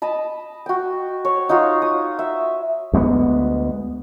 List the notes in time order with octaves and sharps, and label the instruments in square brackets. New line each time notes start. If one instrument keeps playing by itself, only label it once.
[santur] D#5 A5 B5
F#4 G5
C#5
D#4 F4 F#4 C#5
D#6
E5
[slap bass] D2 G#3 A#3 B3